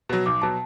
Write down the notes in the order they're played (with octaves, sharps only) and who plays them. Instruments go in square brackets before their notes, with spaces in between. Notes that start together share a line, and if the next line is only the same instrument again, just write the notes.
[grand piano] B2 F#3
[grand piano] B1 [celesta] D6
[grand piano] B2 F#3 [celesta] A5